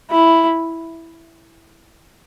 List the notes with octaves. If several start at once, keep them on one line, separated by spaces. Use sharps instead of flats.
E4